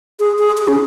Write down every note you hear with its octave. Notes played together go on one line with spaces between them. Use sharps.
G#4
G#4
G#4
C#4